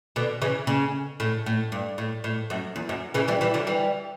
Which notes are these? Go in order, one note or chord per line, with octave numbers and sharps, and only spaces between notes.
B2 D3
C#3 E3
C#3
A2
A2
G2
A2
A2
F#2
E2
F#2
C#3 E3
E3 G3
E3 G3
D3 F#3
E3 G3